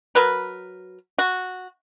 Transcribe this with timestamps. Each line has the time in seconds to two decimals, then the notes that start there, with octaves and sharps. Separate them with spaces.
0.15 F#3 A#4 B4
1.18 F#4